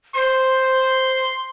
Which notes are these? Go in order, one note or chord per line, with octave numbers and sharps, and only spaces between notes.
C5 C6